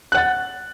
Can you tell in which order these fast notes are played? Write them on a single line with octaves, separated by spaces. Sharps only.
F#6 F#5 A6